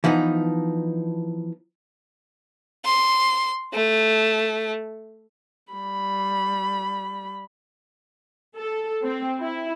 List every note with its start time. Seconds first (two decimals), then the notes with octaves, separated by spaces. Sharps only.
0.04 E3 F3 B3 D#4
2.85 C6
3.74 A3
5.72 G3 B5
8.56 A4
9.04 C4
9.41 E4